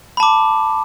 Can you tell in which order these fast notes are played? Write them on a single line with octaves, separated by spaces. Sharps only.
B5 A5 D6